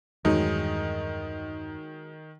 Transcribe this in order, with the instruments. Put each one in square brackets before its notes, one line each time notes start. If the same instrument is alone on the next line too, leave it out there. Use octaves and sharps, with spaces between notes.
[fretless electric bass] E2 G2 [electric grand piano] D#3 [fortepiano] F#3 G#3 D#4